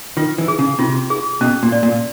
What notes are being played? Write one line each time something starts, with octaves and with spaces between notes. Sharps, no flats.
D#3 F4
E3
G#4
C#3
C3 F4
G#4
B2 C#4
A#2
D5
A#2